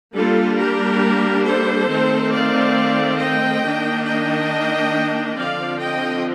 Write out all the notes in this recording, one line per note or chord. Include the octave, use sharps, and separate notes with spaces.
G3 A#3 D4 F4 A4
G4 A#4
A4 C5
D#3 A3 C4
D5 F5
D#5 G5
D#3 A#3 D4
D#5 G5
D3 F3 C4 D5 F5
D#5 G5